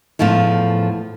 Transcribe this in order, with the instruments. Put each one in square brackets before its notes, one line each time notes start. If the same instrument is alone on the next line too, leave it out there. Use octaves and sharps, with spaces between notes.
[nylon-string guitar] E2 A2 F3 B3 F4